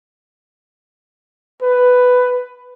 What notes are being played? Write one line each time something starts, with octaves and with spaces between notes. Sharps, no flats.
B4